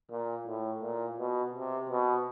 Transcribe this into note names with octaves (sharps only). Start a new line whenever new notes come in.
A#2
A2
A#2
B2
C3
B2